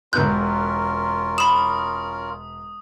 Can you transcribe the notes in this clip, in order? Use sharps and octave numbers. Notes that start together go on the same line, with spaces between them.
E1 B3 C#4 F4 A#4 F#6 G6
B5 D#6 E7